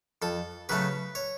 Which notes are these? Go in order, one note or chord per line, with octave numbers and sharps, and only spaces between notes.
F2 A4
C#3 F#3 A3 C#4 B4
C#5